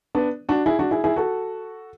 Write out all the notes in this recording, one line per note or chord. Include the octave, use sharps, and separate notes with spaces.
B3 D4
D4 F#4
E4 G#4
D4 F#4
E4 G#4
E4 G#4
F#4 A4